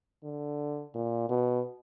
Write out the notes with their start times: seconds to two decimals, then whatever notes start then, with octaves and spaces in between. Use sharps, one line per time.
0.23 D3
0.94 A#2
1.29 B2